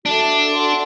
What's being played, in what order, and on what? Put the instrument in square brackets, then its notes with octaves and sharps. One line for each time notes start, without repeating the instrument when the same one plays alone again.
[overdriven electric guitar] D4 [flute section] F#4 A4 E5
[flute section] A4 D5 F#5 C6